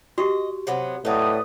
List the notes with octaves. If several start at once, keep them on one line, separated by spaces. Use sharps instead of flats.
F#4 G4 D#5
C3 F#3 B3
A2 F#3 D#4 B4 D5 D#6